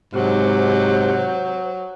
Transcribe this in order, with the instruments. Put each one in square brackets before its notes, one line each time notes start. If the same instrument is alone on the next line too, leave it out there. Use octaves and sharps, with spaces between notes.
[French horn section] G#2 [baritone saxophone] C3 [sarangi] F#3 [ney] C5